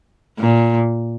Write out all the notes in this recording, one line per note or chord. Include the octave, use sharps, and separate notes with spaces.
A#2